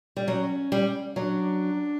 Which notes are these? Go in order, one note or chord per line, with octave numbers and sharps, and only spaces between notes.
G3
F#3 C#4
G3
F#3 D4